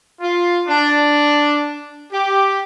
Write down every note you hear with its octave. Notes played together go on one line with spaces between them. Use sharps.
F4
D4
G4